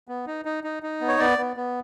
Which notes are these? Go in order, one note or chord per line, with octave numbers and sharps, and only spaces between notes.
B3
D#4
D#4
D#4
D#4
B3
C#5
B3 D5
B3
B3